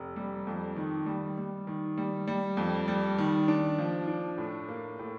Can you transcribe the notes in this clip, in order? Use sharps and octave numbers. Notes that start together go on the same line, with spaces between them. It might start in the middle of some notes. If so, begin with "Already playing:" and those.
Already playing: F1
G3
F2
D#3
G3
G3
D#3
G3
G3
F2
G3
D#3
D4
F3
D4
A2
A#3
A2